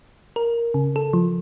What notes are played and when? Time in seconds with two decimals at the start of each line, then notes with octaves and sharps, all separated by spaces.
0.36 A#4
0.74 C#3
0.96 A4
1.13 F3